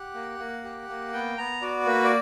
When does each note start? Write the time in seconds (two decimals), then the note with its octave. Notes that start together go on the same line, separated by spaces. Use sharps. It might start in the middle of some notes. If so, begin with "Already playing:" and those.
Already playing: G4 F#5
0.15 A#3
0.39 A#3
0.64 G4
0.89 A#3
1.13 B3 G5
1.38 B3 A#5
1.61 F#4 D5
1.86 A#3 B4
2.04 D5